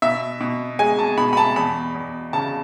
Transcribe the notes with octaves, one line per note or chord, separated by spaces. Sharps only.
B2 E5
B2
G#3 G#5
A5
B2 B5
B5
A5
E2 B5
E2
C#3 A5